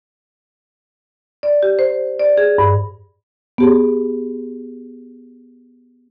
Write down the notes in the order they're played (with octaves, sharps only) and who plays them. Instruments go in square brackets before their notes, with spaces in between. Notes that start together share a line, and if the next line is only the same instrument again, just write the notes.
[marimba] D5
G4
C5
D5
G#4
G2
B3 G4 G#4